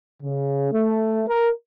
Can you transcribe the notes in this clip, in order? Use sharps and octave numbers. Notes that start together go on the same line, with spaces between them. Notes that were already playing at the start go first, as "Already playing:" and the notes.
C#3
A3
A#4